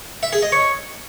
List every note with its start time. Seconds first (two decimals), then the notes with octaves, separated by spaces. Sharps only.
0.23 E5
0.33 G#4
0.42 D#5
0.52 C#5